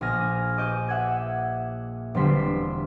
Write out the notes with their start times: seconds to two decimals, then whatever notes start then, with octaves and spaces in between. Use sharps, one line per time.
0.01 A#1 D#5 G#5 F6 A#6
0.57 D#5 D6 G6 D#7
0.88 E5 F#5 G#6
2.14 E1 D3 G3 C4 C6 B6